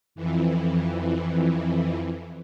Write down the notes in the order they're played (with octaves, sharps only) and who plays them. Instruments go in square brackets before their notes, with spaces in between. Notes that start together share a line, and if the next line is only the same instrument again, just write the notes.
[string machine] F2 E3